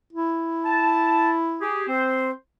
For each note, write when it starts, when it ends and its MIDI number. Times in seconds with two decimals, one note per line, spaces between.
0.13 1.68 64
0.64 1.30 81
1.61 1.84 67
1.61 1.84 68
1.88 2.31 60
1.88 2.31 72